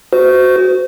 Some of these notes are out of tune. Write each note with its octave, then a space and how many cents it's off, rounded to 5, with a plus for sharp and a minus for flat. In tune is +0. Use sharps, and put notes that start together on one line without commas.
F#4 +0 C5 -30